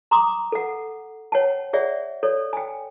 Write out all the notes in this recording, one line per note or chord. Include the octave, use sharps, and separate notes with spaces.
A#5 C6 D6 D#6
A4 F#5
C#5 F#5 G5 A5
G#4 C#5 D5 E5 F#5
A4 C#5 D5
G5 G#5